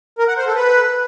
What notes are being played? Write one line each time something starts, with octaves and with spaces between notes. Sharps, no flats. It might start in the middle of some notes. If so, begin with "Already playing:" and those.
A#4
F#5
C5
A4
B4